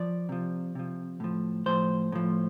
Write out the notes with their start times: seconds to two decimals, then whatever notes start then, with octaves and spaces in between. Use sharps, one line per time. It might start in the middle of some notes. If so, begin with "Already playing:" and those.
Already playing: F3 D5
0.29 C3 F3
0.75 C3 F3
1.20 A2 F3
1.66 A2 F3 C5
2.12 A2 F3